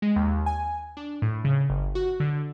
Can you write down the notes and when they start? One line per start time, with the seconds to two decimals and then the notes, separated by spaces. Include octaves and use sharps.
0.02 G#3
0.16 D#2
0.46 G#5
0.97 D4
1.22 A2
1.45 C#3
1.70 G1
1.95 F#4
2.20 D3